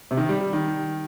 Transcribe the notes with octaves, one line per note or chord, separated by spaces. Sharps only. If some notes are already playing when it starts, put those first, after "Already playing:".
C3
D#3
G3
G3
D#3